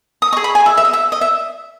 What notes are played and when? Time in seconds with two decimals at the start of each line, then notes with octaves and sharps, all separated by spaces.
0.22 D#6
0.33 G#4 D#5 C#6
0.44 B5
0.55 G#5
0.66 E5
0.77 E5
0.85 D#5
0.93 E5
1.12 D#5
1.21 E5